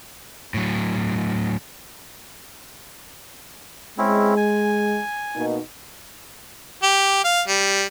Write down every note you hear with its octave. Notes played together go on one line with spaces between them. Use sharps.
A2 F#3
G#3 C4 C#4 E4
G#5
B2 A#3 D#4
G4
F5
G3